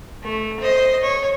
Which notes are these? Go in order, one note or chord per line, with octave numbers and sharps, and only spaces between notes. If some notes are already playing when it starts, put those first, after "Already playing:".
A3
C5 D#5
C#5